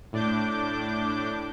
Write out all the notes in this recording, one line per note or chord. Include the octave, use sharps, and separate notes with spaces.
A2 D4 D6 G6